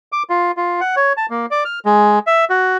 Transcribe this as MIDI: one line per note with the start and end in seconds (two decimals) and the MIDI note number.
0.12 0.23 86
0.30 0.51 65
0.57 0.80 65
0.80 0.96 78
0.96 1.13 73
1.17 1.26 81
1.30 1.46 58
1.51 1.64 74
1.65 1.79 89
1.85 2.19 56
2.27 2.45 76
2.50 2.77 66